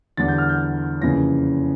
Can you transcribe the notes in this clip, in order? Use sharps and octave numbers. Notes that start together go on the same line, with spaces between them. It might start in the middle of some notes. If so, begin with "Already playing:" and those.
E2 D3 G3 D4 A6
G6
F6
G6
F2 C#3 E3 A#3 C#4 A#6